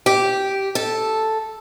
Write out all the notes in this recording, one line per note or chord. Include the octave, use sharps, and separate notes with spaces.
G4
A4